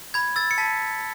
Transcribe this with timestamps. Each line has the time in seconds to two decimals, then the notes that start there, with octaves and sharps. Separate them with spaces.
0.14 B5 G#6
0.36 E6 A6
0.51 C#7
0.58 A5 B6